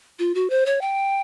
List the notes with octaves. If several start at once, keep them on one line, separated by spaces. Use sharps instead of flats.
F4
F#4
C5
C#5
G5